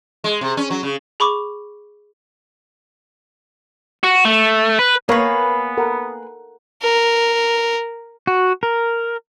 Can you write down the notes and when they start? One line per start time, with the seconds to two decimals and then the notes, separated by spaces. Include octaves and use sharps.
0.24 G#3
0.41 C3
0.57 C#4
0.71 F#3
0.83 C#3
1.20 G#4 B5 C#6 D6
4.04 F#4
4.25 A3
4.79 B4
5.09 A#3 B3 G#4 B4 C#5 A#5 B5
5.77 A4 A#4 F#5
6.83 A#4
8.27 F#4
8.63 A#4